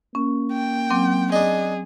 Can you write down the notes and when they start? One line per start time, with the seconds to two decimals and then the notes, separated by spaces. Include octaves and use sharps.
0.15 A#3 C#4
0.52 G5
0.90 F#3 C4 D6
1.32 D4 D#4 G#4